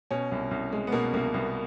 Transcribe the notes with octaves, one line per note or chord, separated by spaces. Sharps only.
B2 C#4
C2
C2
G#3
B3
B2 A#3
C2 A#3
C2 B3